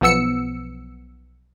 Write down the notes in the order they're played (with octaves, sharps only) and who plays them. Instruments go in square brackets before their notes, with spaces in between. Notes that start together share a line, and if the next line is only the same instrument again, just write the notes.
[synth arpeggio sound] B1 F3 B3 E6 C#7